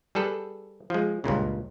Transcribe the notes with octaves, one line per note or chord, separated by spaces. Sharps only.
G3 G#4 A4 B4
F3 G#3
C#2 G2 A#2 C#3